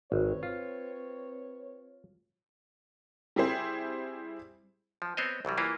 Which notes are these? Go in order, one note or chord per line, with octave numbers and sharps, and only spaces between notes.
G#1 C4 B4 C#5
F4
G3 C4 E4 G#4 C5
F3
B3 C4 C5 C#5 D#5
C2 E3 F#3 G3
E3 A#3 E4 F4